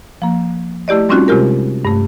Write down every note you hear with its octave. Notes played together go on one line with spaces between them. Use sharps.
F3 A#3
A3 E4 G4 D5 D#5
G3 C4 C#4 D#4 F4 F#4
C3 G#3 F4 G4 A#4
G2 A3